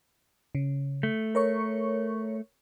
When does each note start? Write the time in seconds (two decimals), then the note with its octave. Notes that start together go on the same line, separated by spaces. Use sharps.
0.55 C#3
1.03 A3
1.35 A#4 C#5 C#6